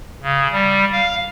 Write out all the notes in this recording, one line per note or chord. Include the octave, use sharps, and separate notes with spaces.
C#3
G3
F5